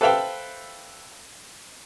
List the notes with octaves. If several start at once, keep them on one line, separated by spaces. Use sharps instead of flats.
A4 B4 C5 E5 F5 G5